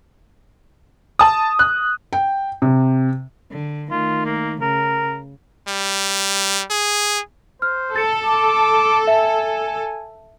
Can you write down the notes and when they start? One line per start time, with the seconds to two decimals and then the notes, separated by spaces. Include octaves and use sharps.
1.19 A5 D#6
1.59 F#6
2.13 G5
2.62 C3
3.51 D3
3.91 D#3 A3 F4
4.26 A#3
4.61 C#3 A#4
5.68 G3
6.70 G#4
7.62 C5 F6
7.96 A4 A6 C#7
8.25 D6
9.07 E5 G#5